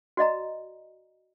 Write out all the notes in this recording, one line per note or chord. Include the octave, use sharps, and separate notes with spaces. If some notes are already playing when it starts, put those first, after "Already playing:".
F#4 D5 D#5 A#5